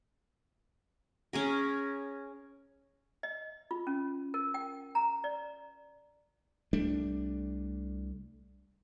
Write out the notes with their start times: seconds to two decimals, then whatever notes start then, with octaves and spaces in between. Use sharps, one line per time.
1.33 C#4 G#4 A#4
3.23 D#5
3.71 F4
3.87 C#4
4.34 A#4
4.54 G5
4.95 A#5
5.24 D5
6.73 C2 G3 A3 D4